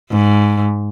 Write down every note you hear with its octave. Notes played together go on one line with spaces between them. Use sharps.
G#2